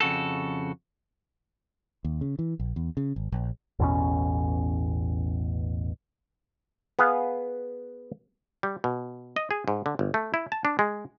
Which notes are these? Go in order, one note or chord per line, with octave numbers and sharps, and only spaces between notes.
F2 C#3 F#4 A4
D#2
C#3
E3
A#1
E2
C#3
G#1
A#1
A1 E2 B2 C#4
B3 G#4 B4 F5
G3
B2
D#5
G#4
G#2
D3
G1
A3
E4
A5
D4
G#3